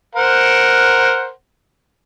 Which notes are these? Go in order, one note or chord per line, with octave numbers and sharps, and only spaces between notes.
A#4 C5 F#5